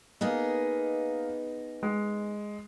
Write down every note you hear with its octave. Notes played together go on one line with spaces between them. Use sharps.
A#3 B3 D#4 G#4 D#5
G#3